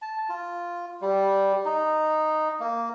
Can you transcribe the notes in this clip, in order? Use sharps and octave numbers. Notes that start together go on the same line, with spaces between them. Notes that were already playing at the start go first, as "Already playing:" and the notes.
A5
F4
G3
D#4
A#3